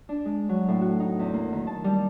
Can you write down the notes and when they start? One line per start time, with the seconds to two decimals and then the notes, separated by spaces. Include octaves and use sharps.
0.09 D4
0.25 G#3
0.49 F#3
0.68 A2
0.81 F#4
1.00 D#4
1.19 E2
1.34 A#3
1.52 D#3
1.67 A5
1.84 G3